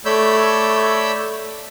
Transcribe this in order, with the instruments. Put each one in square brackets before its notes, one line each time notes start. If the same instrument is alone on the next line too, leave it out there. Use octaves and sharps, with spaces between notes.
[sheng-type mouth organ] A3 C#5 D5 B5 E6 G6